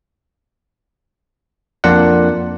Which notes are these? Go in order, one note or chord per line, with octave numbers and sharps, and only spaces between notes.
F2 A#3 D4 F4 D5 F#5